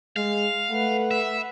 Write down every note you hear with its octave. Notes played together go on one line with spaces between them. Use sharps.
G#3 F5
A3 B4 F#5
E5